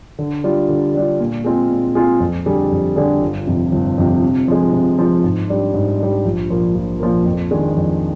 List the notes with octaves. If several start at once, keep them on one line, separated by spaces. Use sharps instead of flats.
D3
G3 D4 F4
D3
G3 D4 F4
A#2
G#3 C4 F4 G#4
A#2
G#3 C4 F4 G#4
F2
D3 G3 D4 G#4
F2
D3 G3 D4 G#4
G1
F2 C3
G1
F2 C3
C3
F3 G#3
C3
F3 G#3
G#2
G3 D4
G#2
G3 D4
A#1
A#2 F3 A#3
A#1
A#2 F3 A#3
F2
D#3 G#3 D4 G#4
F2